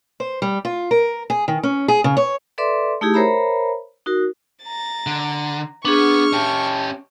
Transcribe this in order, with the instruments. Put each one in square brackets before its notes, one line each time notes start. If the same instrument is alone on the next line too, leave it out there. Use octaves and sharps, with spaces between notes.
[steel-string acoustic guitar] C5
G3
F4
A#4
G#4
D#3
C#4
G#4
C#3
C#5
[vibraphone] A4 B4 D5 E5 C6 D6
A3 D#4 E4 G4 G#4
A#4 C5 C#5 E5 A#5 B5
D#4 F#4 A#4
[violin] A#5 A6
[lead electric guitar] D3
[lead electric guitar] B3 [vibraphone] D4 G#4 [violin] C#6 F6
[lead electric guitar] C#4 G4 [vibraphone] A5